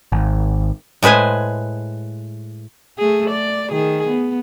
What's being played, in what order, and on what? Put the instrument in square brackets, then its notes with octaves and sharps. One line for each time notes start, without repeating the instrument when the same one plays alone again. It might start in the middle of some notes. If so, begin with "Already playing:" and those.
[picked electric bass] G#1
[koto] A2 G#3 B4 C5 G#5
[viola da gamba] A3 G#4
D5
D#3 G#4
B3